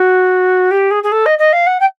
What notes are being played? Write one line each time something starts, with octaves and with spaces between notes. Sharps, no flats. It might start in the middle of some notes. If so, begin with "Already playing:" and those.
Already playing: F#4
G4
G#4
G#4
A4
D#5
D#5
F5
F#5
G5